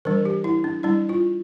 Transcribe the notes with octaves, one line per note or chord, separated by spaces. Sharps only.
E3 G3 D4 A#4
G4
E4
D4
G3 D4 E4
F4